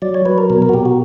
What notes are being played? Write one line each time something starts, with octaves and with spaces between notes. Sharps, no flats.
F#3 D5
C#5
F#3 B4
A#4
B2 A#4
A#4
F#4
B2 G4
F#4